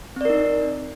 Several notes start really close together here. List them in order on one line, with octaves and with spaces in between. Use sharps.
C4 D5 A#4 D#4